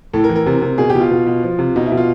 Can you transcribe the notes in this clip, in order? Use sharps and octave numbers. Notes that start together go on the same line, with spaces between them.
A2 A4
A#4
E3
A#4
C3
C3
B2 G#4
G4
B2
F4
B2
B2
F3
C3
B2 D#4
E4
B2
F4